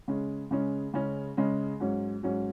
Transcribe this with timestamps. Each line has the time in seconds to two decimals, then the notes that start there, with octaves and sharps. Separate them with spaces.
0.08 C#3 G#3 C#4
0.51 C#3 G#3 C#4
0.94 C#3 G#3 C#4
1.37 C#3 G#3 C#4
1.80 G#2 F#3 C#4
2.23 G#2 F#3 C#4